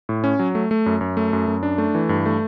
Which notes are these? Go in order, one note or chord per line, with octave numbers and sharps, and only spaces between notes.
A2
C#4
F#3
A3
A3
F#2
F#2
A3
F#2
F#2
D4
A3
E3
G2
A3